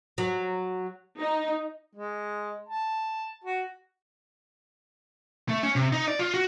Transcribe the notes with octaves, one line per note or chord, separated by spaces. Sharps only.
F#3
D#4
G#3
A5
F#4
A3
C#4
C3
D#4
D5
F4
F#4